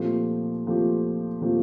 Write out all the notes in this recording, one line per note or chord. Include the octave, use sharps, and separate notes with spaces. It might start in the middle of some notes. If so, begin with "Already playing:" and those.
Already playing: A#2 F3 A3 C4 G4
A#2 F3 A3 C4 G4
A#2 F3 A3 C4 G4